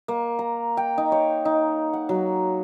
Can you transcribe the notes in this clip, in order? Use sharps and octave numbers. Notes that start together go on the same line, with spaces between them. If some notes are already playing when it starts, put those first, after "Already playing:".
A#3
A#5
G5
D#4
C#5
D#4
F#5
F#3